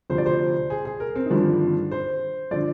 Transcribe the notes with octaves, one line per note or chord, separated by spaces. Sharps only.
D2 C3 F3 C5
D5
C5
G#4
G#4
A#4
C4
D#4
G#1 G2 D3 F3 D4
C5
D3 F3 D5